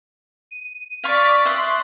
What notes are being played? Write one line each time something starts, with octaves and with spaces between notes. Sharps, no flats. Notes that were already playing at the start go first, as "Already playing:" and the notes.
D#7
D5 F5 C#6 A6 B6
E5 C6 D#6 F#6